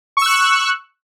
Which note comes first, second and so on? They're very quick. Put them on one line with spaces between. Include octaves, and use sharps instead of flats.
C#6 E6 F#6